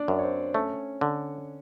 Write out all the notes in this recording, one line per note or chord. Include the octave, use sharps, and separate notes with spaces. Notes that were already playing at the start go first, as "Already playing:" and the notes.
Already playing: D4 D5
F#2
C#5
C4 C5
A3 C#4 C#5
D3